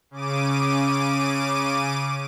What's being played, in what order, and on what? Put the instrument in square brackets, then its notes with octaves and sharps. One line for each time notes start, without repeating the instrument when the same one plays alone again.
[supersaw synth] C#3 D6 D#7